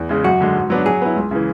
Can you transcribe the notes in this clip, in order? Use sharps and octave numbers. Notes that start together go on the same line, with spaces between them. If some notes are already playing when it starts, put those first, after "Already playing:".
Already playing: E2
C#3 G#3
F#2 F#4
D3 G#3
G#2
F#3 B3 D4
F#3 G#4
B3 E4
C#2
C#3 E3